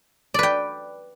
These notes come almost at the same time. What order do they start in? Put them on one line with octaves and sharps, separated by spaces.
D5 B4 G5